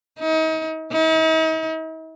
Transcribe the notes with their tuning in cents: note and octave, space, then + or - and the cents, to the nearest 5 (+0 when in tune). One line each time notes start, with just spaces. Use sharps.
D#4 +35
D#4 +45